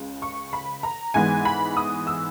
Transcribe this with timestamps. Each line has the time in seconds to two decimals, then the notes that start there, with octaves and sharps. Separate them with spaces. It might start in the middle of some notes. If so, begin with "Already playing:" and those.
Already playing: C#2 C#3
0.22 C#6
0.53 B5
0.83 A#5
1.14 G#2 E3 G#3 B3 G#5
1.45 B5
1.77 D#6
2.07 E6